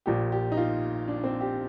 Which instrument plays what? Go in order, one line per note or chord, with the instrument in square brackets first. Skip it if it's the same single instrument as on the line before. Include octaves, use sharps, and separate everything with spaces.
[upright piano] A#1 A#2 G4
G4
D#4
F4
D4
C4
G4